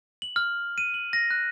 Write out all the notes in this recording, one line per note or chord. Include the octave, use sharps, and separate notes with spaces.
F#7
F6
D#7
F#7
A#6
F#6